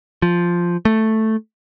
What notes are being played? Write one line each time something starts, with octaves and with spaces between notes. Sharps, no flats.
F3
A3